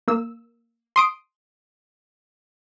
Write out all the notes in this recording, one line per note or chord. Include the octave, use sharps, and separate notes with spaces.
A#3 E6
C6 D#6 D7